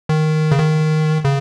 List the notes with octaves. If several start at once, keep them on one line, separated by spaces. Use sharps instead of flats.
D#3
C#3
D#3
C#3